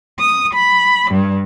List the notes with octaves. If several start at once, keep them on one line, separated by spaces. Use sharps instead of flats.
D#6
B5
G2